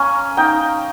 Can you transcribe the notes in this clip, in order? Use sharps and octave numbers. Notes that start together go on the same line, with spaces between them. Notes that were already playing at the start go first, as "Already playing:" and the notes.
Already playing: A#3 C#4 G#5
D#4 G5